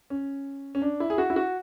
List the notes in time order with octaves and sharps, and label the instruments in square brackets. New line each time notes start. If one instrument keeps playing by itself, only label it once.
[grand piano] C#4
C#4
D4
E4
G#4
F#4
E4
F#4